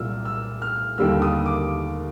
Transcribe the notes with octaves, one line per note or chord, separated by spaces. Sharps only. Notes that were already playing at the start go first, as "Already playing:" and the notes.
Already playing: C2 A#2 F#3 E6 F6
E6
F6
D#2 D3 G3 A#3 E6
D#6
D6